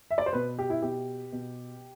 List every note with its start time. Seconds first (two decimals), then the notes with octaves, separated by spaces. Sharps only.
0.11 E5
0.18 D5
0.26 C5
0.33 B2 B4
0.59 G4
0.70 E4
0.82 B2 G4
1.32 B2